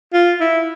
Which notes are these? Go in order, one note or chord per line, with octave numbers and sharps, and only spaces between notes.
F4
E4